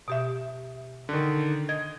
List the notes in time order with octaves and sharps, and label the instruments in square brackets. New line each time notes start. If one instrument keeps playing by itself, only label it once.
[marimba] B2 G4 E5
[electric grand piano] D3 D#3
[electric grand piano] D#5 [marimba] G#6